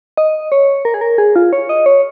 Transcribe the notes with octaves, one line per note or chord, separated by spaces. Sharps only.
D#5
C#5
A#4
G#4
A#4
G#4
F4
C#5
D#5
C#5